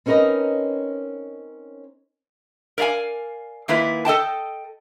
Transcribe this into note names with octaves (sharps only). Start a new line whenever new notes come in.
C4 C#4 D#4 A#4 B4 D#5
A#4 D5 E5 F5 G#5
D#3 A#3 E4 F4 B4
A4 D#5 G5 A5